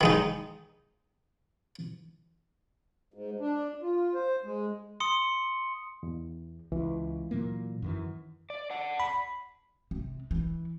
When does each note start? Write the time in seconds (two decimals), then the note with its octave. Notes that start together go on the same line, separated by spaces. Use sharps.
0.01 D#3 G#3 D#4
3.14 G#2
3.40 D4
3.82 F4
4.14 C5
4.45 G#3
5.00 C6 D#6 C#7
6.03 E2
6.72 C#2 E3
7.31 A#2 F#3 A#3
7.82 F#2 D#3 E3
8.50 D5
8.70 D5 F#5
9.00 B5
9.91 C3
10.31 E3